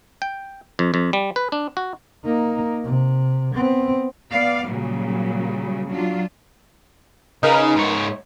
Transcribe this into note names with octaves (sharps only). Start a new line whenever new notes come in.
G5
F2
F2
G3
B4
D4
F#4
A#3 D#4
C3
B3 C4
B3 D5 F5
A#2 C#3 F#3 G3
F#3 D4 F4
C#3 D#4 A#4 B4
G#2 C#5